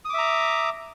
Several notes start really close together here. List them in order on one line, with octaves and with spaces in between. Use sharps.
D#6 D6 E5 A#5